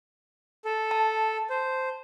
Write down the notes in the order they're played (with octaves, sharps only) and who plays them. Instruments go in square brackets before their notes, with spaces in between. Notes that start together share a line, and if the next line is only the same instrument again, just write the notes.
[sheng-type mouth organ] A4
[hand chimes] A5
[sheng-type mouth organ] C5